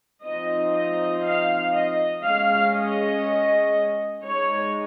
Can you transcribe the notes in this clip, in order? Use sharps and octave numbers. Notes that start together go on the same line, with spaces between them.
F3 C4 D#4 D#5
D#5
F5
D#5
G#3 C#4 F5
D#5
G#3 D#4 C#5